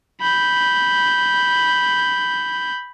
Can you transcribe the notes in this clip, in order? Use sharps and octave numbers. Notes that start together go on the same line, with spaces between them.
B5 G6